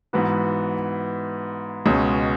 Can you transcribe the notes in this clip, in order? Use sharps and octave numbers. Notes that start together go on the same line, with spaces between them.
G#2 E3 B3 F#4 B4
C#2 B2 G#3 C#4